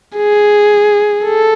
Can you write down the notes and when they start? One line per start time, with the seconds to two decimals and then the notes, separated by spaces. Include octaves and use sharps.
0.16 G#4
1.25 A4